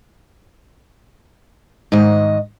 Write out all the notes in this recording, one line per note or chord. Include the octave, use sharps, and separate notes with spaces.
G#2 D#3 D#5